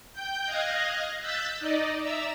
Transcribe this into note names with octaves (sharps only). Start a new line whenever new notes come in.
G5 G6
D#5 F5 F#6 G#6 A#6
E6 F#6 G6 A6 B6
D#4 D5 D#5
D5 E5 A#5 E6